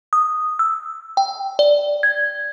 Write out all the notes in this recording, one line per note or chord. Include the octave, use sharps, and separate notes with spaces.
D#6
E6
G5
D5
G#6